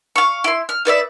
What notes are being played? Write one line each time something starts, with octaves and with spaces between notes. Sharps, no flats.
F5 C#6
E4 C6
F6
D#4 B4 D5 E5